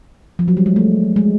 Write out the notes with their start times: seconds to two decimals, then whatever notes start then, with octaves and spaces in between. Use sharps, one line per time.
0.39 F3
0.48 F#3
0.57 G3
0.66 G#3
0.76 A3
1.16 G#3